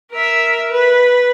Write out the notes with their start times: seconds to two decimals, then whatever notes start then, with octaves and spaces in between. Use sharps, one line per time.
0.11 A#4 E5
0.71 B4